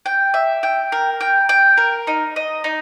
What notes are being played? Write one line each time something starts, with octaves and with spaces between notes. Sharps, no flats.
G5
E5
G5
A#4
G5
G5
A#4
D#4
D#5
D#4